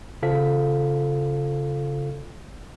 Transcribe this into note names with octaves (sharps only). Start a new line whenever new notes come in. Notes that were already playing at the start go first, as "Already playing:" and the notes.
C#3 F4 A4 C5 F5 B6